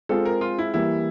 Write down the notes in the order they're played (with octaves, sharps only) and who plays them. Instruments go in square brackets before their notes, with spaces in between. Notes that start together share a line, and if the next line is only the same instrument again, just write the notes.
[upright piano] G#3 C4 F4 G#4 [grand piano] A4
[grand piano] A#4
F4
E4
[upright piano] E3 G3 A#3 [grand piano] E4